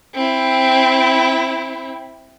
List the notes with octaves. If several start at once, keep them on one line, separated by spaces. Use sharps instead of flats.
C4 E4